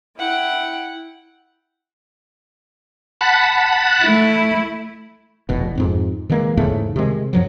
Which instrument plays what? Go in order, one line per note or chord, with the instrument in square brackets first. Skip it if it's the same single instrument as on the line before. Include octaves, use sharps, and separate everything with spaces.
[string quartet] E4 F#5 G5
[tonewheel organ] F#5 A5 B5
[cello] A3 E4
[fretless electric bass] F1 E2 B2
F2 G#2 C4
D#3 E3 G#3 A#3
E2 G#2 C#3 A3
C3 D#3 G#3
F#2 F3 F#3